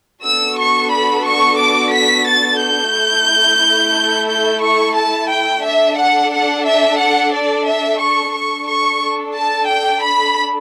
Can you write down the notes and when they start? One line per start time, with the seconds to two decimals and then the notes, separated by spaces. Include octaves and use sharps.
0.23 B3 D4 F#4 A4 E6
0.58 C#6
0.91 B5
1.25 C#6
1.59 D6
1.92 B6
2.27 A6
2.60 G6
2.93 A3 E4 A4
4.28 G6
4.62 C#6
4.96 A5
5.30 G5
5.64 D4 A4 E5
5.97 F#5
6.32 F#5
6.65 E5
6.98 F#5
7.32 D5
7.66 E5
7.99 C#6
8.33 D4 A4 C#6
8.67 C#6
9.35 A5
9.68 G5
10.02 B5